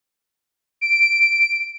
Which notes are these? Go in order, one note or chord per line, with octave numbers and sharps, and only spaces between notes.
D7